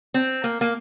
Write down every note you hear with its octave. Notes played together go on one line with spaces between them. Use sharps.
C4
A#3
A#3